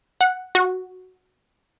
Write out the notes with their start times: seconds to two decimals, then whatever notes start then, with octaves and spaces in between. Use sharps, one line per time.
0.21 F#5
0.55 F#4